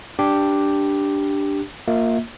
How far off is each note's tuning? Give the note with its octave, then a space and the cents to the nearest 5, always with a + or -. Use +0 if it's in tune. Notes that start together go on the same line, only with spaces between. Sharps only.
D4 +0 G4 +0
A#3 -10 F4 +20 E5 -35